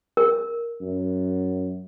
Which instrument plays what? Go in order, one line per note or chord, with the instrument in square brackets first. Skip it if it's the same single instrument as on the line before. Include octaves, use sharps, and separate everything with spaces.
[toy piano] A#4
[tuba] F#2